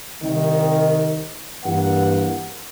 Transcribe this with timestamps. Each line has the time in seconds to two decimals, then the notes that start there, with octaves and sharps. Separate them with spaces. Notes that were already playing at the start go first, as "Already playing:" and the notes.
0.22 C2 D#3
1.65 G2 E3 A#3 F#5